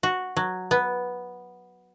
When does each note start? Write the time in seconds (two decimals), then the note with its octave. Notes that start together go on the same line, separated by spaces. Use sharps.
0.03 F#4
0.37 F#3
0.71 B3